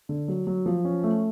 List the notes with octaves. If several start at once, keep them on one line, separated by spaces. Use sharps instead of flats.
D3
F#3
F#3
F3
C#4
A3